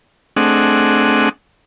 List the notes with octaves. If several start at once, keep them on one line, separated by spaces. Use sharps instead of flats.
A3 C4 D4 G#4 D#5 F#5